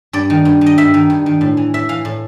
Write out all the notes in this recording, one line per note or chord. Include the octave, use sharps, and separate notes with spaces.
G2 D5
D#3
G2
D#3
D#5
G2 E5
D#3
G2
D#3
A2
E3
A2 E5
E3 F5
A2